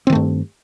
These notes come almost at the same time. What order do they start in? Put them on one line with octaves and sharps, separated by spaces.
C4 D#3 A3 G2